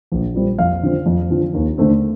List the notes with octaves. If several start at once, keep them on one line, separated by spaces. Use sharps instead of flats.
A#1
A#2 G3 C4
F2 F5
D3 F3 C4
F2
D3 F3 C4
D#2
D3 A3 C4